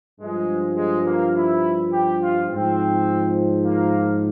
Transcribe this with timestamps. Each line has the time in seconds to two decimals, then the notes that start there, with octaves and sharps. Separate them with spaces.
0.20 G2 F3 G#3
0.77 G#3
1.06 A#3
1.35 E4
1.92 G4
2.21 F4
2.50 G#2 F3 C4
3.64 A#3